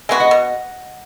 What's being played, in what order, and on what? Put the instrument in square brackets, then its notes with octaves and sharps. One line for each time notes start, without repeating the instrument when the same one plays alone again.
[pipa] G#3 B3 F#4 [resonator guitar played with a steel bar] E5 G#5
[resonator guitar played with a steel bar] D#5 F#5
[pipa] B2